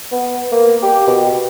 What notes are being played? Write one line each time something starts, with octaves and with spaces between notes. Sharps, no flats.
B3
A#3
G4
B2